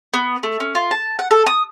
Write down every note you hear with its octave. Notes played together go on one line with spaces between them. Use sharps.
B3
A3
C#4
F4
A5
F#5
A4
D#6